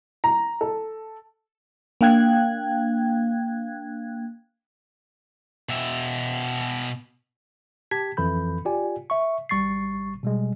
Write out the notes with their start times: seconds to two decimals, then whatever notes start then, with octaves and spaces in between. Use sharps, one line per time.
0.24 A#5
0.61 A4
2.01 A#3 D4 F5 G5 F#6 G#6
5.69 B2 E5
7.91 G4 A5 G#6 B6
8.17 F2 E3 A4 B5 G6
8.65 F4 G4 D5 G#5
9.10 E5 C#6
9.49 G#1 G3 C#6 A6 C7
10.23 B2 G3 G#3